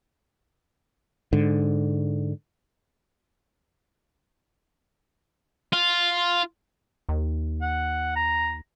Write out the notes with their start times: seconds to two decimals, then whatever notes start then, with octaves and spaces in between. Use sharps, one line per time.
1.33 G#2 D3
5.73 F4
7.09 D#2
7.62 F#5
8.16 A#5